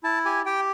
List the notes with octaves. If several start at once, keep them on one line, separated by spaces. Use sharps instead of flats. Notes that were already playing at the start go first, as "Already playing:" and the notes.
E4 A5
G4 G#5
G4 G5